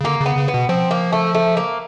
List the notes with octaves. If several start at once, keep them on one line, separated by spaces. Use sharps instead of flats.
C#3
D3 A#3
C#3
B3
C#3
B3
B2
F3 C4
A#3
A3
A3
A#3